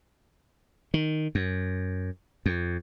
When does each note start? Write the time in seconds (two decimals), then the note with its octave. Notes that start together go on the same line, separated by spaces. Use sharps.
0.94 D#3
1.35 F#2
2.46 F2